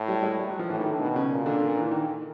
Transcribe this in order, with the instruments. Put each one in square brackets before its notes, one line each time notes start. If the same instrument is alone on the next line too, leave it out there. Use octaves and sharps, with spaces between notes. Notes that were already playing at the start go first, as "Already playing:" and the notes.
Already playing: [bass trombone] A2
[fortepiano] G3
G#3
G3
F#3
F3
[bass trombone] A2 [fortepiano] E3
[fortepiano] D#3
D3
[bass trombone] B2 [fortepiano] D#3
[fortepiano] C#3
[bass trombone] A#2
[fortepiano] D3
D3
E3
D#3